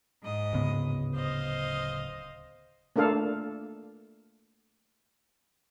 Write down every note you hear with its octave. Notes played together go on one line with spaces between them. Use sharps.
G#2 D#5
D1 C#3 B3
C5 D#5 F5
A3 A#3 D4 A4 F5